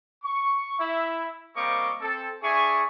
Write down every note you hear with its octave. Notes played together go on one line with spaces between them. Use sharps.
C#6
E4 E5
G3 A#3 C4 D#5 C#6 D6
C4 A4
D4 G#4 E5 G#5 C#6